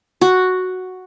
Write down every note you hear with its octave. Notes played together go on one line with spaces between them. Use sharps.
F#4